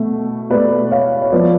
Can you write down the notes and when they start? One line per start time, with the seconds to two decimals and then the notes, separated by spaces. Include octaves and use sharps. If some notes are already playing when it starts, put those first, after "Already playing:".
Already playing: B2 A3
0.50 B2 A3 B4 D5
0.91 C#5 F5
1.22 C#5
1.32 F3 B3 B4 D5